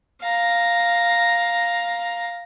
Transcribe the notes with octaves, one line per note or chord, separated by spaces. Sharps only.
F5 A#5